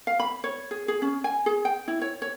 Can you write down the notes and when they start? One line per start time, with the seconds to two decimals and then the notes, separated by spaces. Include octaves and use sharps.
0.07 F5
0.20 B5
0.44 C#5
0.71 G#4
0.88 G#4
1.02 C#4
1.24 G#5
1.46 G#4
1.65 G5
1.88 E4
2.01 C#5
2.22 C#5